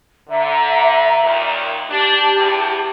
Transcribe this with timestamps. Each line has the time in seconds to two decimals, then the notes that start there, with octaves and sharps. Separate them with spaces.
0.29 D3 E5 A#5
1.22 D#2 A#2
1.90 D4 G4 A5
2.36 E2